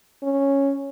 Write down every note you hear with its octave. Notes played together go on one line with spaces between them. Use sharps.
C#4